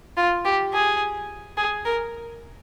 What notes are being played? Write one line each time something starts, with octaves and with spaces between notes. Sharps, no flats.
F4
G4
G#4
G#4
A#4